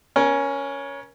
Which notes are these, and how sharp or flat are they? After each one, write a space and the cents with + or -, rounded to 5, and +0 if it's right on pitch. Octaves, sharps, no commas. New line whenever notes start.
C#4 +5 A#4 +35